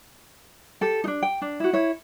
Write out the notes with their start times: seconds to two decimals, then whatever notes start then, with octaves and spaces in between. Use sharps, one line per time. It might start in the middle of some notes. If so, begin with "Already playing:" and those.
0.81 G4 A4
1.04 D4 D#4
1.23 G5
1.42 D4
1.60 E4 F#4
1.73 E4 C#5